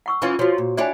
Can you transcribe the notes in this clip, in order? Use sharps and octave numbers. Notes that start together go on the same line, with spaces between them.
F#5 C#6 E6
E3 C#4 F4
F3 F4 F#4 C#5
A#2
D4 E4 C#5 D5 G5 G#5